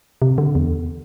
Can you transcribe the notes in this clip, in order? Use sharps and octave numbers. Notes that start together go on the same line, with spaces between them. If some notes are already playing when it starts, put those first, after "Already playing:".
C3
D3
E2